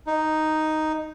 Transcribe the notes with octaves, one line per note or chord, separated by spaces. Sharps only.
D#4